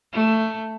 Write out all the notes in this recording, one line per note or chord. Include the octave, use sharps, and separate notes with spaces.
A3